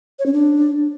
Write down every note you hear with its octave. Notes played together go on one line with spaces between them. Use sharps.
C#5
C#4
D4